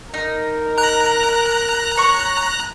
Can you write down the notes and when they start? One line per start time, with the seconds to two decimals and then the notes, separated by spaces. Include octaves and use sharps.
0.14 D#4 A#4
0.78 A#5 F#6
1.97 C#5 C#6